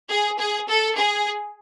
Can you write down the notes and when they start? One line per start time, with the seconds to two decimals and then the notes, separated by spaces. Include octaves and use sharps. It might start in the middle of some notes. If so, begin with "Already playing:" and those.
0.09 G#4
0.39 G#4
0.68 A4
0.97 G#4